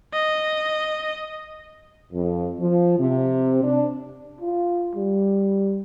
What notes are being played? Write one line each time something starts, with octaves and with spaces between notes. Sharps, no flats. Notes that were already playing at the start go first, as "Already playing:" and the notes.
D#5
F2
F3
C3
D4
F4
G3